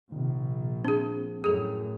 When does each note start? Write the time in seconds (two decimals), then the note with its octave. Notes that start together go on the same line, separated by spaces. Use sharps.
0.12 A#1 C3 D#3
0.85 C4 D4 G#4
1.44 F#2 A2 G#4 A4